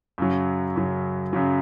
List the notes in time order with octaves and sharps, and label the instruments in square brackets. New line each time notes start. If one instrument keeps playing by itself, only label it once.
[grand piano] F#2 C#3 F#3
F#2 C#3 F#3
F#2 C#3 F#3